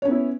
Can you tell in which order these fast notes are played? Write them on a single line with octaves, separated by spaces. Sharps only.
C#5 C#4 B3 E4